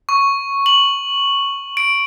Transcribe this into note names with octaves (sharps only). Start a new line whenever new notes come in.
C#6
F#7
D7